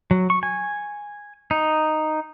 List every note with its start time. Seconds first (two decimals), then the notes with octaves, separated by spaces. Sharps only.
0.11 F#3
0.30 C#6
0.43 G#5
1.51 D#4